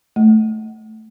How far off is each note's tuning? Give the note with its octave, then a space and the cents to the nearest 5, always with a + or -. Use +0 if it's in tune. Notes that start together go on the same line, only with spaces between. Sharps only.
A3 -5